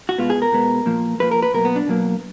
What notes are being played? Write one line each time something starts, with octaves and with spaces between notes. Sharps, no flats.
F#4
B2 G#3 B3 F4
G#4
A#4
B2 G#3 B3
A#2 F3 A#3
A#2 F3 A#3 B4
A#4
B4
B2 F#3 A#3 A#4
B3
D4
B2 F#3 A#3